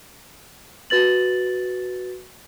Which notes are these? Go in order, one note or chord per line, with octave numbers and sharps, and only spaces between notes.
F#4 B4 A6 F#7